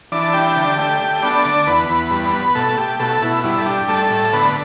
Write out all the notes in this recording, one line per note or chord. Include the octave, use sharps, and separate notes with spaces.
E3 D4 D5
A5
D4 G4 G5
D3
A3 G4 G5
A3
B3 D4 D5
D3
E2 B3 B4
E2
G2
B3
B2 A3 A4
A3 G4
B2 A3 A4
B2 E4
G2 E4
A4
D4 G4
G3 A3 A4
A2
D3 B3 B4